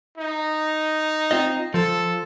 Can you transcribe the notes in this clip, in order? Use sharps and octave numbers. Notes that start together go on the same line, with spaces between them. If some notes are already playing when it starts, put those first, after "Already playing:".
D#4
C4 F4 D#5
F3 A4